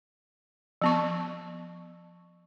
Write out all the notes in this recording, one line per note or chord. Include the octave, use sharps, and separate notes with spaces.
F3 B3 C#6